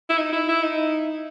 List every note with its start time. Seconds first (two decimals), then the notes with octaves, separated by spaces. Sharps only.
0.10 E4
0.18 D#4
0.33 E4
0.48 E4
0.63 D#4